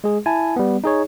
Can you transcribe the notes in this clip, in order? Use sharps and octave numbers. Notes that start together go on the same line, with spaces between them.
G#3 G#4
E4 G#5 A5
G3 B3
D#4 G#4 C#5